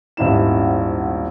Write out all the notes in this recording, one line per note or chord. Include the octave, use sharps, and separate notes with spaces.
D#1 G#1 D#4 E4 E7